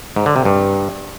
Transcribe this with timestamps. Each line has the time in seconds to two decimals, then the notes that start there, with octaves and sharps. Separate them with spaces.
0.16 G#2
0.26 D3
0.36 C3
0.45 G2